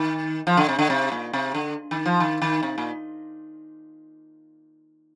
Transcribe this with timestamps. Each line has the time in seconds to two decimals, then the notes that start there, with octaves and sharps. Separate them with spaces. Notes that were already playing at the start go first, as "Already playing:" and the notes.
Already playing: D#3
0.47 F3
0.57 D3
0.69 C3
0.79 D3
0.90 C3
1.12 A#2
1.33 C3
1.55 D3
1.91 D#3
2.06 F3
2.20 D#3
2.42 D#3
2.63 C3
2.78 A#2